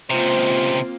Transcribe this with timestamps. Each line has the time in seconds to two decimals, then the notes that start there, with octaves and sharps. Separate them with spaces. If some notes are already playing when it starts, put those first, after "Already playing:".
0.11 C#2 C3 A#3 C4 F4 C5